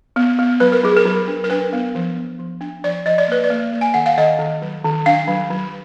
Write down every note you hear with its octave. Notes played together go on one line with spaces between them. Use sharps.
B3
B3
F#3 B4
A#4
F#3 G#4
A#4
F#3
D4
A#4
D4 B4
B3
F3
B3
F3
D4
F3 D5
F3 D#5
D5
A#3 B4
D5
A#3
A#3
G#5
D#3 F#5
F5
D#3 D#5
D#3
F#3
D#3
D4 F5
F#3
F#3